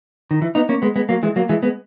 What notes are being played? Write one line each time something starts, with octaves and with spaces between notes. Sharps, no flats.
D#3
E3
B3 D#4
A#3 C#4
G#3 B3
G#3 B3
F#3 A#3
E3 G#3
F#3 A#3
E3 G#3
G#3 B3